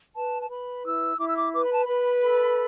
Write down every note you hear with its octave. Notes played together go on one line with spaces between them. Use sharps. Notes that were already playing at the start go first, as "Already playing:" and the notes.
B4 A5
A5
B4 B5
E4 E6
E4 D6
E6
D6
B4 D6
B5
A5
B4 B5
A4